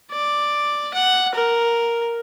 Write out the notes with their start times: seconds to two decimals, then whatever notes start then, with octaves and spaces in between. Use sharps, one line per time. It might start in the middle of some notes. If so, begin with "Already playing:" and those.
0.11 D5
0.94 F#5
1.35 A#4